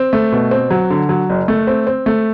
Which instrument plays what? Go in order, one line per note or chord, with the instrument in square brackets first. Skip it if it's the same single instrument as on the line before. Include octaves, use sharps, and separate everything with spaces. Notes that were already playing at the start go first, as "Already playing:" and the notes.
Already playing: [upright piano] C4
A3
B2
C4
F#3
D3
F#3
F#1
A3
C4
C4
A3